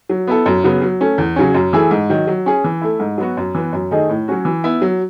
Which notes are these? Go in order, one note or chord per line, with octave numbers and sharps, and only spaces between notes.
F#3
B3 E4 A4
F#2
C#3 F#3 B3
F#3
A3 C#4
E2
C#3 F#3 C#4
F#2
E3 A3 E4 G#4
G#2
D#3 F#3
F#3
C#4 G#4
E3
A3 E4
G#2
F#3 B3 F#4
F#2
E3 B3
F#2
D#3 A3 D#4 G#4
A2
F#3 C#4 F#4
E3
B3 E4
F#3